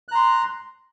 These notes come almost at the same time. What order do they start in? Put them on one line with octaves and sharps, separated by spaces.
F#6 A#5 C6